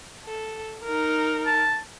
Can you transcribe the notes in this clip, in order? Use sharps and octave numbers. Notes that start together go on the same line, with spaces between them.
A4
D#4 A#4
A5